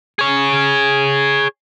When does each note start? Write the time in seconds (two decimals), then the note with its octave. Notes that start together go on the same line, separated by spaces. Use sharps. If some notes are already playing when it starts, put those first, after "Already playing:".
0.19 G#4 C#5